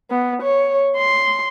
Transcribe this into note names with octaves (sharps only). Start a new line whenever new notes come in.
B3
C#5
C6